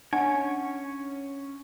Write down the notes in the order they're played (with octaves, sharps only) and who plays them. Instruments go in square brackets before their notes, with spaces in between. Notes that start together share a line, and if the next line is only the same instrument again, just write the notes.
[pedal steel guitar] C#4 C#5 [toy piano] D4 [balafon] F#5